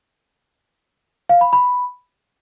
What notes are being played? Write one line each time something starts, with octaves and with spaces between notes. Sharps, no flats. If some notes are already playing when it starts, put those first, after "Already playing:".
F5
B5
B5